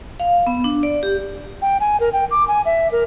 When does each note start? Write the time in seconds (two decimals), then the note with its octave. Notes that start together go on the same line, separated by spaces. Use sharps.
0.20 F5
0.47 B3
0.64 D4
0.83 D5
1.03 G4
1.62 G5
1.80 G#5
2.00 A#4
2.13 G5
2.31 D6
2.48 G#5
2.65 E5
2.92 A#4